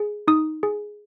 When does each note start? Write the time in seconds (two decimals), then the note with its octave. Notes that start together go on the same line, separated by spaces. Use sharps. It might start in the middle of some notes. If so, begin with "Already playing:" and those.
Already playing: G#4
0.28 D#4 D#6
0.63 G#4